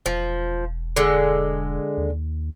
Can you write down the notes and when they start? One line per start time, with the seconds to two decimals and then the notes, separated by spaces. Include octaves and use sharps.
0.06 E1 F3
0.96 D3 G#3
1.98 D#2